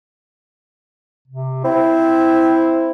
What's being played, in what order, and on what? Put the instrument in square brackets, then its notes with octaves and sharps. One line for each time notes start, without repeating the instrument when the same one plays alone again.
[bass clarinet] C3
[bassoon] C4 [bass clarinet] E4